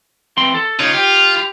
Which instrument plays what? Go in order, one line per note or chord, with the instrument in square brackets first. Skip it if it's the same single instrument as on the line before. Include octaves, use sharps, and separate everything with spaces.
[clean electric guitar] E3 C4 C6
A4
[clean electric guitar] C#3 D#4 C#5 [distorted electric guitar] F4
[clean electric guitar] G4